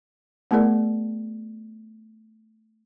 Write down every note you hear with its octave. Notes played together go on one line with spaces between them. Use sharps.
A3 B3 E4 G#4 A#4 D5